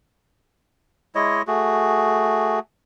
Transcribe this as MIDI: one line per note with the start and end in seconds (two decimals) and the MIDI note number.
1.15 1.42 56
1.15 1.42 64
1.15 1.42 73
1.15 1.42 75
1.47 2.59 57
1.47 2.59 66
1.47 2.59 68